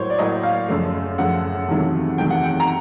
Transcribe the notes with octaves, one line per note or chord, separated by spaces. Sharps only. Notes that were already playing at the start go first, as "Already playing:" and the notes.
Already playing: A2 F#3 A#3 C5 C#5
D5
A2 F#3 A#3 D#5
F5
F#2 C#3 F3 A3
F#2 C#3 F3 A3 F#5
E2 C3 D#3 F#3 A3
E2 C3 D#3 F#3 A3 G5
F#5
G5
A#5